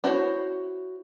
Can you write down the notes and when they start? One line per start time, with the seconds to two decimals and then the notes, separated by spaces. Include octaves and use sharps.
0.04 D4 E4 F#4 C5 C#5